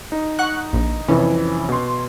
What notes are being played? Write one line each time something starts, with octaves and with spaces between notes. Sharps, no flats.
D#4
F#5 C#6 F#6
A#1
C2 F2 E3 C#4
B2 C6